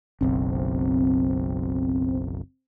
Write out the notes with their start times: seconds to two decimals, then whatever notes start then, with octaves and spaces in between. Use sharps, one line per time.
0.21 F#1 B1 C4